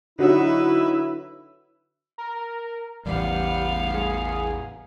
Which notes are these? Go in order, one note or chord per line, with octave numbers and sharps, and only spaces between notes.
D3 F#3 D#4 E4 F#4 B4 C#5 E5
A#4
A1 E2 G3 B3 F5
G#4